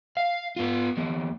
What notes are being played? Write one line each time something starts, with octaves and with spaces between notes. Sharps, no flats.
F5
B3 F4
E2 A#3